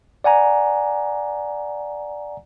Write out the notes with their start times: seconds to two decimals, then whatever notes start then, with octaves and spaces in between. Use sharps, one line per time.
0.24 D5 F#5 G#5 A#5